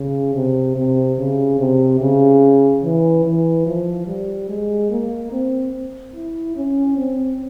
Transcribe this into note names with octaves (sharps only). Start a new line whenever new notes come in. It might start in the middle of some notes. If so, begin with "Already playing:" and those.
Already playing: C#3
C3
C3
C#3
C3
C#3
E3
E3
F3
G3
G#3
A#3
C4
E4
C#4
C4